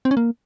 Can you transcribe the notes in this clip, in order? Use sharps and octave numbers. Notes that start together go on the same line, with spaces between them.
C4
C#4
A#3